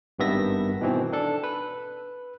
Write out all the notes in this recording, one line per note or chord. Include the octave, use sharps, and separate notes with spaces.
G#1 G2 D#3 B3 E5 A#6
B2 D#3 E3 C4
D4 A4
B4